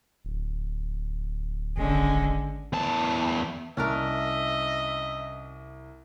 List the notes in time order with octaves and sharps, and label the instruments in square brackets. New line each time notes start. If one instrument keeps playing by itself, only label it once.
[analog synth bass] D1
[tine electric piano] G#1 [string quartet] D3 G#3 C#4
[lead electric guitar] E2 A5
[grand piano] C2 [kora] C#4 D4 A#4 [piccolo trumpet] D#5 [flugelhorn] E5